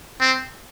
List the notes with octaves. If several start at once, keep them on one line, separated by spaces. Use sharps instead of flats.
C4